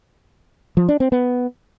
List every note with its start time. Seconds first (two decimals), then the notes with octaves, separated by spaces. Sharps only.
0.77 F3
0.89 D4
1.00 C4
1.12 B3